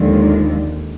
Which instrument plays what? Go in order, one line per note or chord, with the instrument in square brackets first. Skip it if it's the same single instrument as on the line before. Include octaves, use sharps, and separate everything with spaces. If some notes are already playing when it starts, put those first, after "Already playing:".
Already playing: [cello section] D#2 D3 F3 G#3